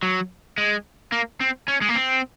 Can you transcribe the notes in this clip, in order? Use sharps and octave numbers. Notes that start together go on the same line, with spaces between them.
F#3
G#3
A#3
C4
C#4
G#3
A#3
C4